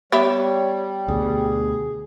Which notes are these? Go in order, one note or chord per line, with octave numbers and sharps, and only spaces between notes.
G3 B3 G4 C#5 E5
D2 B2 G#4